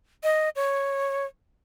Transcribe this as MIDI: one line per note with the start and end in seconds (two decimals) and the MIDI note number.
0.23 0.49 75
0.56 1.26 73